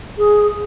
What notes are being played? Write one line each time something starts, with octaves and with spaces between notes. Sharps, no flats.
G#4